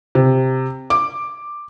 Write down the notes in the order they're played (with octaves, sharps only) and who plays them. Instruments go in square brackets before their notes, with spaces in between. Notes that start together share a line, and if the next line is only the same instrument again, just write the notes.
[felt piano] C3
D6